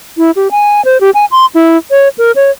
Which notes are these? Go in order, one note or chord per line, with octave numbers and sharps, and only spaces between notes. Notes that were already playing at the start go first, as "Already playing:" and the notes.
E4
G4
G#5
C5
G4
G#5
C6
E4
C#5
A#4
C#5